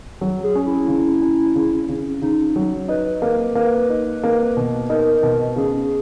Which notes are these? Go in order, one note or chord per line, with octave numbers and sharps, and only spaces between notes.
F#3
G#4
C#4
E4
C#3
C#4
C#3
C#3
C#3 D#4
F#3
D#4 B4
A#3 B4
A#3 B4
D#4
A#3
B2
D#4 A#4
B2
C#3 G#4